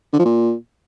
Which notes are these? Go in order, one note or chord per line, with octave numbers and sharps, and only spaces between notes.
D3
F3
A#2